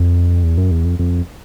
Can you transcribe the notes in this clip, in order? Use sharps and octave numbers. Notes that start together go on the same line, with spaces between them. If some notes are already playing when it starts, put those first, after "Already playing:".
Already playing: F2
E2
F#2
E2
F2
F2